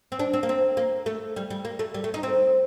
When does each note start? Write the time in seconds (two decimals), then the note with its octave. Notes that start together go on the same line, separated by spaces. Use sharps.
0.12 C4
0.19 D4
0.33 C4
0.43 A#3
0.49 C4
0.77 A#3
1.06 A3
1.36 G3
1.50 G3
1.65 A#3
1.79 A3
1.94 G3
2.04 A3
2.14 D#4
2.23 C4